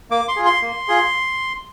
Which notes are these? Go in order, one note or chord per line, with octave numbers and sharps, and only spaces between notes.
A#3 D6
C6
F4 G#4
C6
A#3
F4 G#4